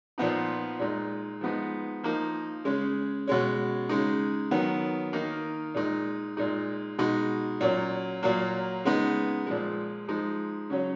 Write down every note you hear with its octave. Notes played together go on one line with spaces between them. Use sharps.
A#2 F3 B3 D#4
A#2 G#3 D#4
F3 G#3 B3 D#4
F3 A#3 D#4
C#3 G#3 C#4
B2 G#3 C#4
C#3 G#3 D#4
D#3 F#3 B3
D#3 A#3 D#4
A#2 G#3 D#4
A#2 G#3 D#4
B2 G#3 D#4
A#2 F#3 C#4
A#2 F#3 A#3
C#3 G#3 B3 D#4
A#2 F3 G#3
F3 G#3 D#4
C#3 F#3 C#4